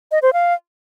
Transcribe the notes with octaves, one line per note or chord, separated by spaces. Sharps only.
D#5
C5
F5